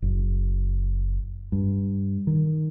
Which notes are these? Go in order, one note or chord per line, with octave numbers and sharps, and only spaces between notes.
F#1
G2
D#3